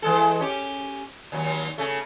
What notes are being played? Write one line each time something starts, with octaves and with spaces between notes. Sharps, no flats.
E3 G#3 A4
C#4 G4
D#2 F#3
C#3 A3